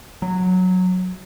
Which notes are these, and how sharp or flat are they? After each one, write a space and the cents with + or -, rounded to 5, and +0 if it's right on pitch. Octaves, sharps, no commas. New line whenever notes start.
F#3 -10